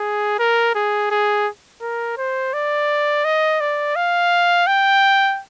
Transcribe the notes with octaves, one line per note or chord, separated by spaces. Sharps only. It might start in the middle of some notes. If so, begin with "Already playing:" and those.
Already playing: G#4
A#4
G#4
G#4
A#4
C5
D5
D#5
D5
F5
G5